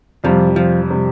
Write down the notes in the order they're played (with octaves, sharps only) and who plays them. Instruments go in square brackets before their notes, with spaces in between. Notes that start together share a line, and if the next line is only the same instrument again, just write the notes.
[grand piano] F2 C3 G3 [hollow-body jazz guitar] F3
[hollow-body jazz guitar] F3
[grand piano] C3 G3